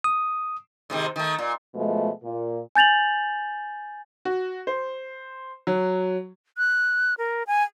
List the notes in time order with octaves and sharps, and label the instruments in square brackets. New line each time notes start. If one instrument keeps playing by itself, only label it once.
[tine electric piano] D#6
[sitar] G#2 C3 D#3
D#3 A3
A#2
[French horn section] B2 F3 G#3 A3
A#2
[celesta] G#5 G6 A6 F7 F#7
[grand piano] F#4
C5
F#3
[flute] F#6
A#4
G#5